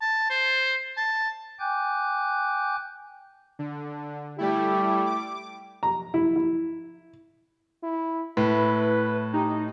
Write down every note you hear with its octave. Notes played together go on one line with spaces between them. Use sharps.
A5
C5
A5
G5 G#5 D6 F#6 G6
D3
G3 A3 E4 G4
D6
A#5
E4
E4
E4
A2 E4 B4
D#4 G4